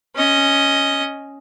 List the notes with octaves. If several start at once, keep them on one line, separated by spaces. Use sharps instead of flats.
C#4 D#5